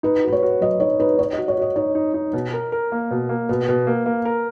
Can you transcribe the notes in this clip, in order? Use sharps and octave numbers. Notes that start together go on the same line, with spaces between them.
D#4 B4
F#4 B4
C#5
F#4
F#3 D#5
D#4 C#5
D#4 B4
D#4 C#5
D#5
F#4
C#5
F#4 D#5
D#4 C#5
D#4
D#4
B2
A#4
A#4
A#3
B2
A#3
B2 B4
B2
A#3
A#3
A#4